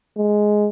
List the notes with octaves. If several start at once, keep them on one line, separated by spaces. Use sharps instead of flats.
G#3